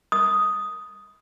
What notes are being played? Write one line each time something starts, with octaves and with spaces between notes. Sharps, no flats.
D#6